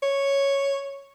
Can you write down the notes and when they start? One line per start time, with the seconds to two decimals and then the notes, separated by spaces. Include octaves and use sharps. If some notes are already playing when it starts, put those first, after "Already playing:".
0.03 C#5